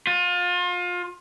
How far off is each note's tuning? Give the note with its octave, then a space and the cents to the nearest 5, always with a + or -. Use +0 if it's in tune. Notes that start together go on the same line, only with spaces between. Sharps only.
F4 +30